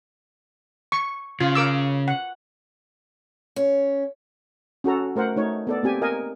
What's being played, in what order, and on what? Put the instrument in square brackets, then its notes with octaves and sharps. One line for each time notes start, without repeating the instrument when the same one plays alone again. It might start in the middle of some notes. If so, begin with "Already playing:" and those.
[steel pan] C#6
[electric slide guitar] C#3 [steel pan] F4
[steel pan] A#4 D6 E6
F#5
[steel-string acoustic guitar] C#4
[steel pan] C#4 F#4 A4 A#5
A3 A#4 C5 F#5
A3 D#4 C#5
B3 A4 D5
A#3 C4 G4 G#5
A#4 D#5 F5 G#5